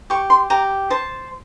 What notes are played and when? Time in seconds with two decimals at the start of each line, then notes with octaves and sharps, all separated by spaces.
0.10 G4 C#6
0.30 C6
0.50 G4 A#5
0.90 C5 A5